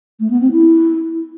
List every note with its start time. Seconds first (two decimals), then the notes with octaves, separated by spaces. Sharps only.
0.20 A3
0.30 B3
0.41 C4
0.51 E4